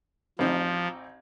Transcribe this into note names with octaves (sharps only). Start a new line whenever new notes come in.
A1 F3 C4 D#4